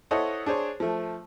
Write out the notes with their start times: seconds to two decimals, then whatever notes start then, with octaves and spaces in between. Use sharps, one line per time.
0.11 E4 A4 C5 C#5 D#5 F#5
0.46 D4 G#4 C5 C#5
0.80 F3 A3